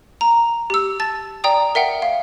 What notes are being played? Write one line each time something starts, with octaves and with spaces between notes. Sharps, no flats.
A#5
G4 E6
A5 A6
D5 G5 A#5 D#6
A#4 E5 F#5 G5
F5